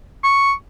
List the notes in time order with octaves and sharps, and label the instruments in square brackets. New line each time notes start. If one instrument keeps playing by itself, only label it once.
[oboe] C#6